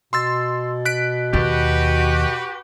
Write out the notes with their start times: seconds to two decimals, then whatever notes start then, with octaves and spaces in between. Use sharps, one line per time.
0.13 B2 C6 E6 A6
0.85 F#6 B6 D7
1.33 D#2 F#4 G4 B4